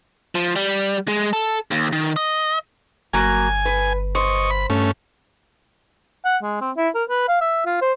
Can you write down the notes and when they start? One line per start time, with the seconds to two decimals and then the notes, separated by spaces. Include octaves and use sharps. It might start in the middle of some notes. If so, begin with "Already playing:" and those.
0.35 F3
0.56 G3
1.08 G#3
1.33 A4
1.71 D#2
1.92 D#3
2.16 D#5
3.13 G1 F#3 A#3 G#5
3.65 B4
4.15 C5 D#5 C#6
4.51 B5
4.70 G2 A3 C#4
6.25 F#5
6.43 G#3
6.61 C4
6.77 E4
6.95 A#4
7.09 B4
7.28 F5
7.41 E5
7.66 F4
7.82 C5